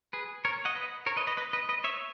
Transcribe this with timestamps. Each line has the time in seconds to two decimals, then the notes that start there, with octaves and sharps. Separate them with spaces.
0.13 G#4 B4
0.45 A#4 C#5
0.65 D#5 F#5
0.75 B4 D#5
1.06 A#4 C#5
1.16 B4 D#5
1.27 B4 D#5
1.37 B4 D#5
1.53 B4 D#5
1.69 B4 D#5
1.84 C#5 E5